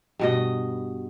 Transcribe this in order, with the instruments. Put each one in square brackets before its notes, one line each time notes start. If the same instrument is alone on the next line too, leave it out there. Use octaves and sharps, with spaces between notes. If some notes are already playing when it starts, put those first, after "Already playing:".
[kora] G2 B2 D#5